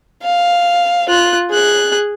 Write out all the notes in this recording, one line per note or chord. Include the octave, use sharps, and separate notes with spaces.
F5
F4 F#6
G#4 F#6